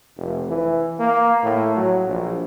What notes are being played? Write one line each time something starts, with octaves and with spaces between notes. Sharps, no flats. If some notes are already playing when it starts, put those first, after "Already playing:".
F1
E3
A#3
A2
F#3
A#1